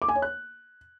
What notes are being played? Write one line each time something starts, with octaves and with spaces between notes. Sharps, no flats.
D6
G#5
C#5
F#6